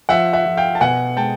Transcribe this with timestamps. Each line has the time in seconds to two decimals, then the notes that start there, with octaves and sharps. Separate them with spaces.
0.09 F3 E5 F#5
0.33 E5 F#5
0.46 F3
0.57 F5 G5
0.75 A5
0.81 B2 F#5 G#5
1.17 G#3 G5 A5